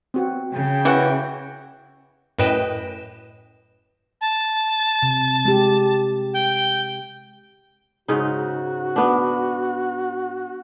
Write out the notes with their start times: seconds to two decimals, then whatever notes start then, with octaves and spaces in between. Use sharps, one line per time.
0.14 C4 F#4
0.53 C#3 G5
0.85 E3 C#4 F#4
2.39 F#2 A2 B4 D#5 G5 E7
4.21 A5
5.03 C3
5.45 G#3 G4
6.34 G5
8.08 G#2 C#3 D#4 F#4
8.96 B3 D4